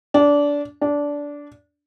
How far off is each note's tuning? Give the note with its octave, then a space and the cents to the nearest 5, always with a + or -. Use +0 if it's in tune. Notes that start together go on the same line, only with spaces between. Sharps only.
D4 -20
D4 -15